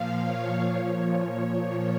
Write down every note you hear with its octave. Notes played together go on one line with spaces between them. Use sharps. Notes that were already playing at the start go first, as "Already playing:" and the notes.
Already playing: A#2 F3 F5
C#5
A#2 F3 C#5